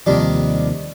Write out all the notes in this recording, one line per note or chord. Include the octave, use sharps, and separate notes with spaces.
D#2 C3 D#3 F3 G3 D4